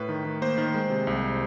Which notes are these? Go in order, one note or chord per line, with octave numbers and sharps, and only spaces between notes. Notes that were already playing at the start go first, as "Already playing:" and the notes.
Already playing: A2 B4
D#3
D#3
A#3 C5
D#3
G#3
C3
C2